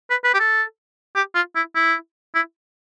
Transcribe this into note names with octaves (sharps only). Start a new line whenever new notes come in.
B4
B4
G4
A4
G4
F4
E4
E4
E4